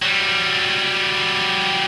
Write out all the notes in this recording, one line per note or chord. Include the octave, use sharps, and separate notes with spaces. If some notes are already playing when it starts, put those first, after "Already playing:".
F#3 G3